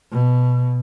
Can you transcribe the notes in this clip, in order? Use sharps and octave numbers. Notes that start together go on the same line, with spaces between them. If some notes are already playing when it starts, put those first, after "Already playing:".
B2